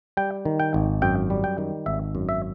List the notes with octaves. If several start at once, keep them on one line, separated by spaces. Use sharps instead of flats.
G3 G5
D#3
G5
G#1
F#2 G5
G3
G5
D#3
G#1 E5
F#2
E5